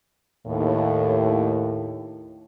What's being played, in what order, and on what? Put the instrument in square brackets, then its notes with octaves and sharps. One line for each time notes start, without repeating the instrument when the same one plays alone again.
[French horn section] D#2 A2